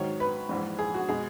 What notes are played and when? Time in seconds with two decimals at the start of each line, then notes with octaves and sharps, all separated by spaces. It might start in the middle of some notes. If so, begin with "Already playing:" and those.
Already playing: G#2 D#3 F#3 C#5
0.20 B4
0.49 A#1 G#2 E3
0.79 G#4
0.94 F#4
1.09 B2 G#3 G#4